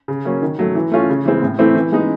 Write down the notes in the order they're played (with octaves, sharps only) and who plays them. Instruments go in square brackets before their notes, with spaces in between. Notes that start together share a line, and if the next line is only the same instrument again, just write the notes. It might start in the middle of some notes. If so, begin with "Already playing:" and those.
[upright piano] C#3
F#3 A#3 C#4
D#3
F#3 A3
E3
A3 C#4 F4
C#3
E3 G#3 C4
A2
E3 A3 C4 E4
E3
G#3 B3 D#4